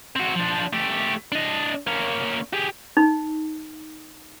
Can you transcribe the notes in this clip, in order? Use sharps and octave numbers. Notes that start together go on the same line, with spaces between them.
C4 F#4
F3 D4
A3 G4
D4 D#5
A#3 C#4
G4 G#4
D#4